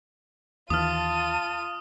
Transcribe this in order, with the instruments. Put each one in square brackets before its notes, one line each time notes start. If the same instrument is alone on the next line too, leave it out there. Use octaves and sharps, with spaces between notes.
[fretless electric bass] D#2 E3 [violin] F4 D#7 [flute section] A5 [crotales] D#6 F6